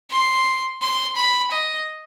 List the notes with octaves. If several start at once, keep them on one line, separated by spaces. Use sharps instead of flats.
C6
C6
B5
D#5